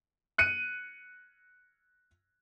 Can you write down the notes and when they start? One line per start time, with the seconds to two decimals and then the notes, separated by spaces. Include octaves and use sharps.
0.38 F#6 C#7 D#7